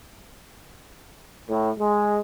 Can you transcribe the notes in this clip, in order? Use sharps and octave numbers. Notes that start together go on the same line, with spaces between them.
A2
G#3